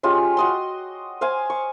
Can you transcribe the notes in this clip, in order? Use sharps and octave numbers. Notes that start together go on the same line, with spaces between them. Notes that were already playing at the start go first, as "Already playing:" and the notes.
G#3 C#4 F4 G4
F#4 D#5 C6
C5 F5 G#5
C#6